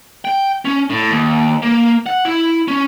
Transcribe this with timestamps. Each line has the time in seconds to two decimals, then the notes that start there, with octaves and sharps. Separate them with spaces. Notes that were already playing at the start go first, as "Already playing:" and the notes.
0.25 G5
0.65 C#4
0.90 A2
1.10 D#2
1.63 A#3
2.06 F#5
2.25 E4
2.68 C#4